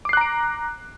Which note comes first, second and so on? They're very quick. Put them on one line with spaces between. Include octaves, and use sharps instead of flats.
D6 C7 F#6 A#5 D7